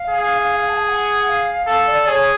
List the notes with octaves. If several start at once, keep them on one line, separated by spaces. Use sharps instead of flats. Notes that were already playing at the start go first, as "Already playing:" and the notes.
Already playing: F5
G#4
A5
G#5
F#5
F5
A4 F5
D5
G#4 C#5